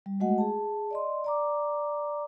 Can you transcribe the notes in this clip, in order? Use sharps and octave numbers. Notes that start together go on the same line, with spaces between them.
G3
G#3 A3 F#4 D#5 F#5
G#4 A5
D5 D#5 C6
D5 A#5 D6